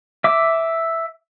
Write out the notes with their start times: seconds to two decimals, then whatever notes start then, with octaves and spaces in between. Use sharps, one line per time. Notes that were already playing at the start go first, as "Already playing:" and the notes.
0.24 E5 D6